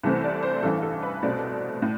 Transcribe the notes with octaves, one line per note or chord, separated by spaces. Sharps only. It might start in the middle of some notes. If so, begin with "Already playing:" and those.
C2 C3 E3 A3 C4
D5
C5
A1 G2 E3 A4
A4
B4
C2 B2 A3 C4 D5
A2